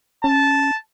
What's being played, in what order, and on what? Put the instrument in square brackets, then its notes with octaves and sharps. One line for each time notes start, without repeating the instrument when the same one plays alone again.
[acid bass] C#4 [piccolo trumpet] A5